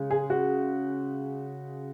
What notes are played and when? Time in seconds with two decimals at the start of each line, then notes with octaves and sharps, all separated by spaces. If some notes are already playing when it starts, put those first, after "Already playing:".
Already playing: C#3 G#3
0.11 G#4
0.30 F#4